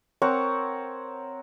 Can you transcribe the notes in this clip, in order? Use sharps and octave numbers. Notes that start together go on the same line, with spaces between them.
C4 A#4 C#5 F#5